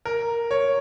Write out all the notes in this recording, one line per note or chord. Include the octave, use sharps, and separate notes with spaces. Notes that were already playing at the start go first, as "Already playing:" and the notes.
A#4
C#5